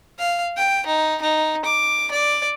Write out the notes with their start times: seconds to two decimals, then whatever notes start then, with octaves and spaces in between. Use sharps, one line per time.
0.19 F5
0.57 G5
0.87 D#4
1.22 D#4
1.65 D6
2.11 D5